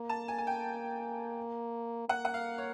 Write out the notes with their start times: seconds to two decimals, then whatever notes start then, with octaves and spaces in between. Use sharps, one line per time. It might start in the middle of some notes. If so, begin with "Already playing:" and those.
Already playing: A#3
0.09 A5
0.28 G#5
0.38 G#5
0.47 G5
2.09 A#3 F#5
2.25 F#5
2.34 F5
2.58 C#5